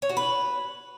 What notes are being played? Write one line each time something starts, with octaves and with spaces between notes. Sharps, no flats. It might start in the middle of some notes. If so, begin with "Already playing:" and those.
C#5
F#4
B4